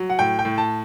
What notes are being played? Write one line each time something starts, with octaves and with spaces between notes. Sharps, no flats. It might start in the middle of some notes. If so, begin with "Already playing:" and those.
Already playing: F#3
F#5
A2 G5
G5
A2
A5